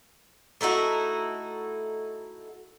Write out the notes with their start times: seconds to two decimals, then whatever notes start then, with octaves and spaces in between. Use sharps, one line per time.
0.61 A3 D#4 E4 F#4